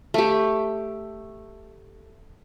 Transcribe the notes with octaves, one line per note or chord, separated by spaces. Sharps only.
A3 G4